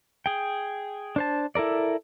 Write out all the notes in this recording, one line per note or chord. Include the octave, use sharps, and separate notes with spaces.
G#4 G5
D4 C5 A5
E4 A4 A#4 D5